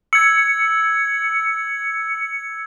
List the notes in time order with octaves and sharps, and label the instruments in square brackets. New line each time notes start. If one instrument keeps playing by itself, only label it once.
[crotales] E6 G#6 [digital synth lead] C#7